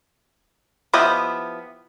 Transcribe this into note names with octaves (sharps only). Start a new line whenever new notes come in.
F3 B3 E4 G4 D#5